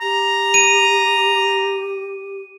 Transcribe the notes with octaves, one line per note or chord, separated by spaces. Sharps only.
G4 A#5
D#7